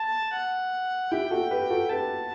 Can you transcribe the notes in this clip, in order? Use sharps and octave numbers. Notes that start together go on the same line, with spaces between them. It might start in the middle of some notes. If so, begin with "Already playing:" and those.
Already playing: A5
F#5
E4 G4 G5
F#4 A4
G4 B4
F#4 A4
G4 B4 A5